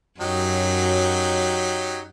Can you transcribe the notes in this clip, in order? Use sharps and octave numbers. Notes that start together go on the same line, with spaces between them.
F#2 F#3 D#4 G4